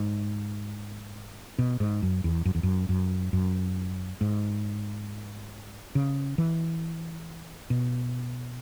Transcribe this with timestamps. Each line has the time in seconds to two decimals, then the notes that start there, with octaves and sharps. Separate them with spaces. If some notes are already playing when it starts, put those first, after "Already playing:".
Already playing: G#2
1.59 B2
1.80 G#2
2.03 F#2
2.24 E2
2.45 F#2
2.55 E2
2.63 F#2
2.89 F#2
3.33 F#2
4.21 G#2
5.95 C#3
6.38 E3
7.70 B2